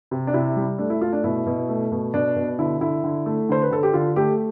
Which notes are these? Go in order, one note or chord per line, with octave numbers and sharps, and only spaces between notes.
C3
D4
C3 E4
G3
A3 D4
E4
A3 F4
D4
B2 E4
B2
A3
B2
B2 D4
B2
D3 E4
D3 E4
D3
A3
D3 C5
B4
D3 A4
G4
D3 F4
A3 G4